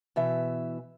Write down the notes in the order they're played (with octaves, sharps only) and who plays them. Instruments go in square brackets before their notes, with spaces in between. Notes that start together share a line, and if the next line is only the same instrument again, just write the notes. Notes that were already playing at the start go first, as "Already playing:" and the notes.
[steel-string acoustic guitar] B2 E3 E5